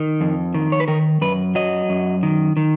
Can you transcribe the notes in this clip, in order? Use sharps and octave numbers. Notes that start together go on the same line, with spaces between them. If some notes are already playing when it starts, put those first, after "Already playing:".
Already playing: D#3
F2
D#3
C#5
B4
D#3 A#4
F#2 B4
F#3 D#5
F#2
D#3
D#3